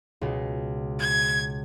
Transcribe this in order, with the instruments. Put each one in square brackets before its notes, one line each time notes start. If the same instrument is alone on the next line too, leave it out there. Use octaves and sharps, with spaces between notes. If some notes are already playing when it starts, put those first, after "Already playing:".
[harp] C#2 B2
[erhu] G#6